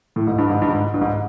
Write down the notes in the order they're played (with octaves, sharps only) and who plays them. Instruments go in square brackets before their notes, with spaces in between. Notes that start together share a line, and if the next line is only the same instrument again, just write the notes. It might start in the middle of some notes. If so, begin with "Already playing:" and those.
[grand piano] A2
G#2
G2
G#2
G2
G#2
G2
G#2